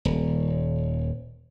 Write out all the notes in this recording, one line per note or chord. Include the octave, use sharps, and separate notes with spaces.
D#1